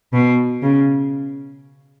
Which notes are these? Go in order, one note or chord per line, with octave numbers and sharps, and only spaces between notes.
B2
C#3